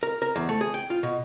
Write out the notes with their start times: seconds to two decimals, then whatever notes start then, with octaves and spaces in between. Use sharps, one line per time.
0.03 A#4
0.22 A#4
0.36 E2
0.49 A3
0.61 G#4
0.74 G5
0.90 F4
1.03 B2